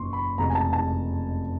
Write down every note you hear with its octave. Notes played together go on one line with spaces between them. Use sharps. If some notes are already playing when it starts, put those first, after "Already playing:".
Already playing: F#1 E2 B2 C6 C#6
B5
F1 E2 B2 G#3 A#5
G#5
A5
A5